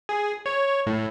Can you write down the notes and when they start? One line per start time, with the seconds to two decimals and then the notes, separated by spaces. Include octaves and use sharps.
0.09 G#4
0.46 C#5
0.87 A2